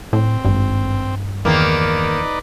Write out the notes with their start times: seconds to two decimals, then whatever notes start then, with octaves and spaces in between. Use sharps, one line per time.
0.13 A2 C4
0.45 G#1 G2
1.45 E2 D#3 A#3 D#4 B4 D5